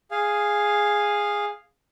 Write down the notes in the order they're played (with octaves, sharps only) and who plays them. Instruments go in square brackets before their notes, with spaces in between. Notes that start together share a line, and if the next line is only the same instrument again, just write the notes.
[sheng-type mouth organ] G#4 F5